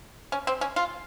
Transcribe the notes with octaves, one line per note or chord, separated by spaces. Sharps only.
C#4
C4
C#4
F4